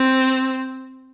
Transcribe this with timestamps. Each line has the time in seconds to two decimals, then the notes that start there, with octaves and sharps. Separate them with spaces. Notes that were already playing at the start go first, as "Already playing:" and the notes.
Already playing: C4